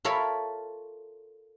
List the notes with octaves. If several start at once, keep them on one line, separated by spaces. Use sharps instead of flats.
F4 A4 A#4 C#5 E5 B5